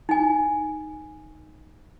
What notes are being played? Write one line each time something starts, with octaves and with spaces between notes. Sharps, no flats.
D#4 G#5